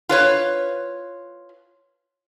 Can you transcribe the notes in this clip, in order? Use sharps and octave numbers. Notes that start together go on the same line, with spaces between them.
F4 B4 C#5